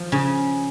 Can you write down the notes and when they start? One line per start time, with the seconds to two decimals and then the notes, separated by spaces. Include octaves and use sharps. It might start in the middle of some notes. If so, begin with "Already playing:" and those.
Already playing: F3
0.12 C#3